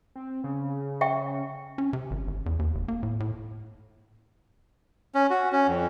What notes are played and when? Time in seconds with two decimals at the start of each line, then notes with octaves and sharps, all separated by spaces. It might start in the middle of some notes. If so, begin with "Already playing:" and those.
0.16 C4
0.44 C#3
1.01 E5 G5 C#6
1.78 C#4
1.93 C3
2.11 G#1
2.27 G1
2.46 E2
2.59 D#2
2.75 F1
2.88 A#3
3.03 A2
3.20 A2
5.15 C#4
5.30 F#4
5.52 C#4
5.67 F2